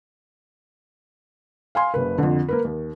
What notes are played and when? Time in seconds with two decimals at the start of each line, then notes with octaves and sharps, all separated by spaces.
1.75 F5 G#5 C6
1.94 F#1 C#3 B4
2.18 F2 D3
2.48 A#3 A#4 B4
2.64 D#2